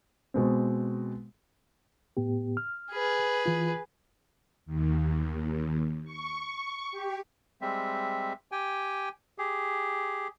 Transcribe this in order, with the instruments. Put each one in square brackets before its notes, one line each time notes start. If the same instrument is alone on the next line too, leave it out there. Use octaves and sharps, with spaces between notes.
[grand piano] B2 G#3 C4
[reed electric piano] A2 B3 G4
F6
[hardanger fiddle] G#4 B4
[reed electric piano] E3 F4
[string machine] D#2
C#6
G4
[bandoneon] G3 G#3 C4 E5
G4 G5 G#5
G4 G#4